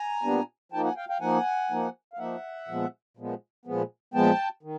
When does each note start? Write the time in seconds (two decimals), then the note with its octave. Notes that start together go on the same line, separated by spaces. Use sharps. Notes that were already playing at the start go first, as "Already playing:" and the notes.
Already playing: G#5 A#5
0.23 A#2 G3 B3 D4
0.72 F3 A#3 D#4 G5 A5
0.84 F#5 G#5
0.96 F5 G5
1.09 F5 G5
1.21 F3 A#3 D#4 F#5 G#5
1.71 F3 A#3 D#4
2.13 F5
2.18 F3 A#3 D#4 E5 F#5
2.68 A#2 F3 G#3 B3
3.17 A#2 F3 G#3 B3
3.65 A#2 F3 G#3 B3
4.14 A#2 F3 G#3 B3 G5 A5
4.63 D#3